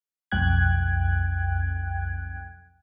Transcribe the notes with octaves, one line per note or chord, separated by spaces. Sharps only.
B1 F2 G5 F#6 G#6